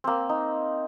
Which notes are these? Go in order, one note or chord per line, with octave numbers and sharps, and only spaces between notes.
A#3 C4
D#4